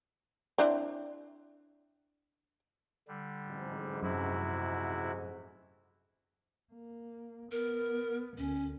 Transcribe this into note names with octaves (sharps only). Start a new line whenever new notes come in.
C4 D4 E4
D3 G3
A1 F2 G#2
F#2 C3 E4 F#4
A#3
B3 A#4
D2 C#4